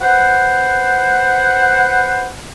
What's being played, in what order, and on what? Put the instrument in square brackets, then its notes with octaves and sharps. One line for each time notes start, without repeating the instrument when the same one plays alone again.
[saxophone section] B4 C5 F#5